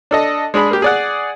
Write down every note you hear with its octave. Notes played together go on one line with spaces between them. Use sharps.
D4 A4 D#5
G#3 D4 G#4 B5
A#3 G4
G#4 D5 F#5